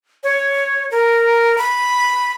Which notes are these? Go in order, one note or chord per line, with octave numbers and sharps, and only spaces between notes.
C#5
A#4
B5